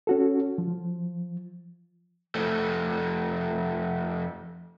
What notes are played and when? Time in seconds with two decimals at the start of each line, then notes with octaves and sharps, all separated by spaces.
0.07 C#4 F#4 A4
0.58 F3
2.35 F2 A3